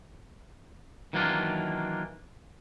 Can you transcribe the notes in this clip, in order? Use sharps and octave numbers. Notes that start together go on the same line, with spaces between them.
D#3 E3 F#3 A#3 D4 F4